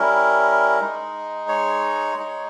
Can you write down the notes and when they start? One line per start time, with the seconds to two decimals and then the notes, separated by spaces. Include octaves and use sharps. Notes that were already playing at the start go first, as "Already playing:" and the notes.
Already playing: G3 C#4 E4 A#4
0.81 G#3 D#4
1.48 C#5
2.17 G#3 D#4